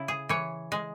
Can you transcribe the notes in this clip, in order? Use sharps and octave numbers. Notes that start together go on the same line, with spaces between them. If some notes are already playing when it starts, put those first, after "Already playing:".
Already playing: C#3 E4
G#4
E3 C#5
G#3